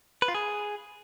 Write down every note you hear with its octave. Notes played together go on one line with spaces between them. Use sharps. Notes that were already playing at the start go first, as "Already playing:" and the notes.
B4
F4
G#4